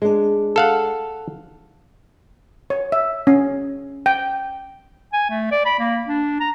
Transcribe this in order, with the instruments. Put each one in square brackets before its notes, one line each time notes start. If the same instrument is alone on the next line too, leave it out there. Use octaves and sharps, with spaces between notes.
[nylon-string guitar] G#3 D4
[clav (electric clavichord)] A4 F5 F#5
[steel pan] C#5
E5
C#4
G5
[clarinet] G#5
A3
D5
B5
A#3
D4
A#5